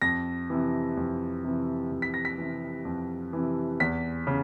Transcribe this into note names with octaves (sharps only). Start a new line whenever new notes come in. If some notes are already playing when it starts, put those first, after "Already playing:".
F2 A#6
C3 E3
F2
C3 E3
F2
B6
A#6
B6
C3 E3
F2
C3 E3
E2 B6
C#3